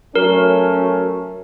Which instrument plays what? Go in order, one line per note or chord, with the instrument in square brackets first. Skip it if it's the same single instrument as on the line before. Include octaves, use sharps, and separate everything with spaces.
[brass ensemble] F#3 A3 C#4 [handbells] A#4